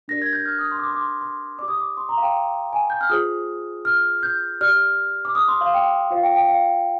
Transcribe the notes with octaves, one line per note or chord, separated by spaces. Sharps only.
D4 G4 A#4 D5 A#6
G#6
G6
F6
D#6
C6
D6
C6
D6
C6
C6
G4 D5 D6
D#6
D6
C6
A#5
F5
G5
G#5
G6
F6
F4 G#4 C5 D#6
F6
G6
G4 D5 F6
D6
D#6
C6
F5
G5
F4 C5 F5
G5
G5
F5